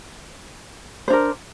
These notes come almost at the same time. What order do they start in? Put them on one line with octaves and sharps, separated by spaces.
C5 D4 A#4